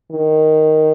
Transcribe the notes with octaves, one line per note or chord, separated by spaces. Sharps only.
D#3